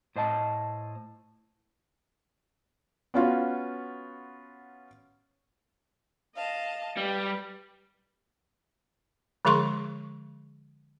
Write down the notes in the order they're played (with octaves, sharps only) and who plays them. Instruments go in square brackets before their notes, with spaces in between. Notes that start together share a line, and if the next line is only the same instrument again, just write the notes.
[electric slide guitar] A2 C5 D#5 A5
[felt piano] B3 C#4 F4 F#4
[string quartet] D#5 F5 A5
[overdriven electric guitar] G3 [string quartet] B4
[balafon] D3 F3 G#3 G#4 C6 C#6